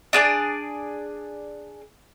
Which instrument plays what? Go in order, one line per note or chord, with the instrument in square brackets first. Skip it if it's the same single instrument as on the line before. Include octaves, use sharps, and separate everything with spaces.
[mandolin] D4 G#4 D5